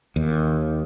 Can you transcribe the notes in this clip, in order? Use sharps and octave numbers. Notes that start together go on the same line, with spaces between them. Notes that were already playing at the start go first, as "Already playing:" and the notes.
D#2